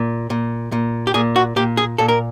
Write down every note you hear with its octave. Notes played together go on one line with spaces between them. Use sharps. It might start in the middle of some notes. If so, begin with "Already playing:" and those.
Already playing: A#2
A#2
A#2
G4
A#2 G#4
F#4
A#2 G4
G#4
A#2 A4
A#4